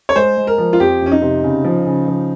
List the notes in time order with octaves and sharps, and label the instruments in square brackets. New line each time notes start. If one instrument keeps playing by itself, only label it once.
[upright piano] C#5
[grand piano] G#3 [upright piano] C5
[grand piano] G#3
[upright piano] A#4
[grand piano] F3
[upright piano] F4
[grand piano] F2 [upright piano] G4
[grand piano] F2 [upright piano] C#4
[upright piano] D#4
[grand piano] C3
C#3
F3
C#3
F3